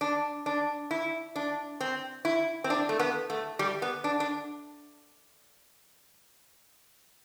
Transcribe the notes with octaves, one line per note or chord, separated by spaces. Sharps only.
D4
D4
E4
D4
C4
E4
C4
D4
A3
B3
A3
G3
B3
D4
D4